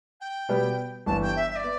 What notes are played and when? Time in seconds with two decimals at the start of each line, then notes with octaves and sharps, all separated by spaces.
0.20 G5
0.49 B2 G3 B3 G4 B4
1.06 G1 G2 E3 B3 A5
1.21 G5
1.36 E5
1.50 E5
1.55 D5
1.64 B3